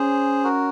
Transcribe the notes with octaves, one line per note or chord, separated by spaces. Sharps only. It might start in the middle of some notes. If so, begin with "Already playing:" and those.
Already playing: C#4 G#4 C5
F#4 A#4